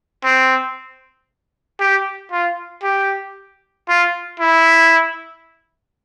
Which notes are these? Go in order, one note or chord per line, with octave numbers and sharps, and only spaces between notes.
C4
G4
F4
G4
F4
E4